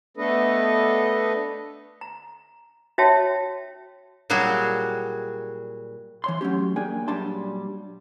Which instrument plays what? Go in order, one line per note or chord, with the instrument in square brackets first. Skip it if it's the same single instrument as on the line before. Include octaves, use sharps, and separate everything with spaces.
[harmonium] A3 B3 D4 A4 B4 D#5
[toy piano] A#5
F#4 C#5 E5 G5 A5
[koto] A#2 F#3 G3 F#4 G#4
[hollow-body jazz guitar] E3 C#5 C6
F#3 A3 C#4 G4
A#3 D4 G#4 G5 G#5
A#2 F#3 G3 D4 A5 C6